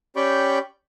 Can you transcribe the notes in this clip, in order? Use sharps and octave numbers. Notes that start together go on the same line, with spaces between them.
C#4 G4 D5 G5 B5 C#6